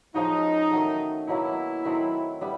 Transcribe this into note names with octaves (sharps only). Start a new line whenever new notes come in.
F3 G#3 C#4 D#4 F#4
D#3 F#3 A3
B2 F#3 A#3 E4
D#3 F#3 A3 C4
G3 B3 E4